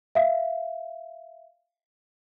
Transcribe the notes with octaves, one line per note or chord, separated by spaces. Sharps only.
E5 F5